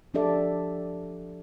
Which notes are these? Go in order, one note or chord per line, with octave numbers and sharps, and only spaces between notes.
F3 D4 G4 A4 D5 E5